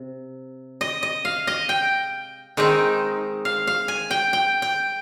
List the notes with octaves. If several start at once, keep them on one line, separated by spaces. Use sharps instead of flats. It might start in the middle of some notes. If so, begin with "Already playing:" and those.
Already playing: C3
D#5
D#5
F5
D#5
G5
D#3 G#3 C4 D#4
F5
F5
G#5
G5
G5
G5